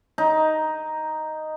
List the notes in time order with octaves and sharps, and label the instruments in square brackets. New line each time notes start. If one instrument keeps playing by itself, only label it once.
[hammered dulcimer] D#4